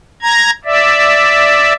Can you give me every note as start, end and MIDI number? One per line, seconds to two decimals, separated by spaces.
0.22 0.50 82
0.22 0.50 92
0.65 1.73 74
0.65 1.73 76